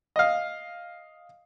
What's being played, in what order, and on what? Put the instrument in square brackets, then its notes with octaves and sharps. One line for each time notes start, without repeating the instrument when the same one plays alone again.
[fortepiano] D#5 F5